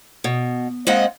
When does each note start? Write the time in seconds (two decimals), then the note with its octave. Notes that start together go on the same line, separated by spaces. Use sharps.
0.24 B2
0.87 G#3 A#3 C4 D#5 F#5